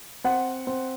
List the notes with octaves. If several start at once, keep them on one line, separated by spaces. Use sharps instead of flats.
C4 F#5
C4